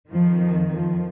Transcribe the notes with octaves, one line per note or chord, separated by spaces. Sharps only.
F2 D#3 F3
F3